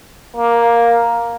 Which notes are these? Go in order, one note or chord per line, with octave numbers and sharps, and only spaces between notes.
A#3